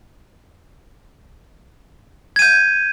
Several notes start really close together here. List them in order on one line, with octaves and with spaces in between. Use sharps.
G#6 D#7 G6